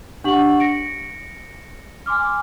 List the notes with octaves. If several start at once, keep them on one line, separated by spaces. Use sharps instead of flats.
D4 G4 F#5 C#6 F#7
A#6 C#7 D7
G#5 C6 D6 F6